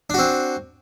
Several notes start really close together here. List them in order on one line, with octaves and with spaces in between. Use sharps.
D4 F#4 C4